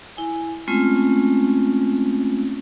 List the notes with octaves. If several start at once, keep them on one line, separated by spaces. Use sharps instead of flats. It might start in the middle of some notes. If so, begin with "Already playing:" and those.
E4 G#5
G#3 A3 C4 C#4 F4